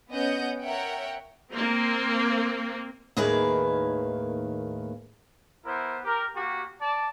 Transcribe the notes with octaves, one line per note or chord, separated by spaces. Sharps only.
B3 C#4 D#5 F#5 G6
A#4 C#5 E5 F#5 G5
A#3 C4
D#2 A2 D#3 A#3 G#4 B4
B3 E4 A#4 C5
G4 A#4
A#3 F#4 G4
D5 A5